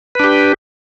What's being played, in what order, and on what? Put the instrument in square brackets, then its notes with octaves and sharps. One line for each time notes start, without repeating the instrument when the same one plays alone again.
[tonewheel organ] B4
D4
G4